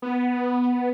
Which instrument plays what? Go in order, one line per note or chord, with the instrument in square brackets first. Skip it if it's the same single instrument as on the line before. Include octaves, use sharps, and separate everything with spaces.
[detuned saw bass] B3